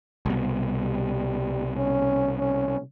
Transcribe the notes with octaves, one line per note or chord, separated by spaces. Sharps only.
C2 B2
G3
C#4
C#4